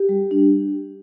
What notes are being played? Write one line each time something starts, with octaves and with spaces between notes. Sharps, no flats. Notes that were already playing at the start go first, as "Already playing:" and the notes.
Already playing: G4
G3
D4